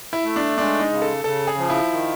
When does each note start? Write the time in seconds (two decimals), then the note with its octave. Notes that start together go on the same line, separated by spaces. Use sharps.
0.13 E4
0.24 A3
0.36 D4
0.57 G#3 D4
0.80 D#4
0.91 C#3
1.02 A4
1.24 C#3 A4
1.48 G#4
1.58 F3
1.70 E4
1.91 D#3